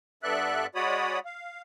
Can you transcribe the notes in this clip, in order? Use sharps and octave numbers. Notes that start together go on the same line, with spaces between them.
G2 B3 A4 D5 E5 F#6
G#3 F#4 C#5 D5 B5 D#6
F5